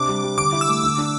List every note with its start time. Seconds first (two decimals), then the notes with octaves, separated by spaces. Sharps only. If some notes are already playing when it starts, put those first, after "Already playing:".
Already playing: C3 D4 D6
0.08 G3
0.23 G3
0.38 D3 D6
0.53 E4
0.61 E6
0.69 A3
0.83 D3
0.98 D4